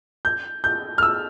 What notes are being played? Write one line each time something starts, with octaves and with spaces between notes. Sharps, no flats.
G6
G6
F6
E6